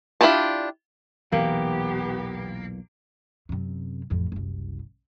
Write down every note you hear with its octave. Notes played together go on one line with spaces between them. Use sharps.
D4 E4 F4 G4 A5
B1 E2 A#2 E3 A#3 B3 G4
F#2 C3
A1 F2
F#1 C2